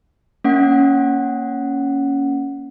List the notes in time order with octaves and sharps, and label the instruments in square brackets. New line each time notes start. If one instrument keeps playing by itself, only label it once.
[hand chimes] A#3 C#4 F#5